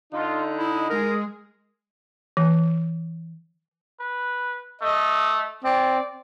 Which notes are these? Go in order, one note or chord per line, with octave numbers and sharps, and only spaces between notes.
D3 D#4 F4
E4 D#5
G#3 G#4 A#4
E3
B4
A3 D#5
C4 D5